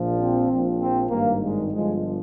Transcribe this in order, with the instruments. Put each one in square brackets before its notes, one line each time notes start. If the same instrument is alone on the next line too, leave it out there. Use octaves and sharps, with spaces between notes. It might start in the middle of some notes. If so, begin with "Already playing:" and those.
Already playing: [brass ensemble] A#1 A#2 F3
C4
A#1 A#2 F3
C4
G#1 G2 D#3 A#3
G#3
G1 G2 F3 G#3